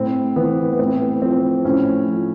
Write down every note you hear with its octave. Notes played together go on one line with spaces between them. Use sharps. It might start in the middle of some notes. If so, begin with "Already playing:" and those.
Already playing: A2 C4
E3 B3
B3
A2 C4
F3 C4
A2 C#4
F3